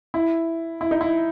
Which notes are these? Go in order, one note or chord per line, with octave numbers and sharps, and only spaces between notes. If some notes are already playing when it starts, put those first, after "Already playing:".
E4
E4
D#4
E4